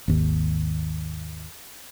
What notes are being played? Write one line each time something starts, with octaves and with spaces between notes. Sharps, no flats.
G#1 D#2